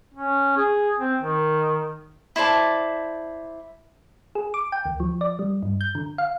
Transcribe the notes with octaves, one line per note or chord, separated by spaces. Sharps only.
C#4
G#4
C4
D#3
E4 C5 D5 A5
G#4
D6
G5
D2
F3
D5
G3
G2
G6
D3
F5